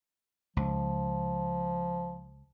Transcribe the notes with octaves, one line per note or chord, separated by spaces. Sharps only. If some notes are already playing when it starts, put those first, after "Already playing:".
C#2 F3